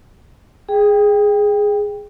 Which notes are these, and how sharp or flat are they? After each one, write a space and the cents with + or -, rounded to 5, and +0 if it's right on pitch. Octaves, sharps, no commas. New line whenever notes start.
G#4 +0 G5 +15